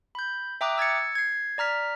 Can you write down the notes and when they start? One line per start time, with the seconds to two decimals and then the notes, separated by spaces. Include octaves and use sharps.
0.15 B5 G6
0.61 E5 G5 A#5 D6 D#6 F#6
0.78 E6 G#6 A6 C#7
1.15 G#6 C7
1.58 D5 A#5 F6 B6